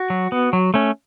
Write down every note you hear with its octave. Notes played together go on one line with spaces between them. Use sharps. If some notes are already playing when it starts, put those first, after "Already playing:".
Already playing: F#4
F#3
B3
F#3
A3 C#4